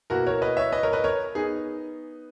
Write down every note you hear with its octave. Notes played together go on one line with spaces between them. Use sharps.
B2 A#3 E4 F#4 A#4
A#4 C#5
B4 D#5
C#5 E5
B4 D#5
A#4 C#5
B4 D#5
A#4 C#5
B3 D#4 G#4